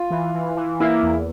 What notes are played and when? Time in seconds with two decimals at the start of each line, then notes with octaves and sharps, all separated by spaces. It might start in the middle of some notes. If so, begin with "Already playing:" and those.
Already playing: F4
0.11 E3
0.34 E3
0.57 E3
0.80 A#3 E4
1.03 E2